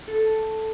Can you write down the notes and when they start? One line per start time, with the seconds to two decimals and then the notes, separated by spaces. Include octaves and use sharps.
0.08 A4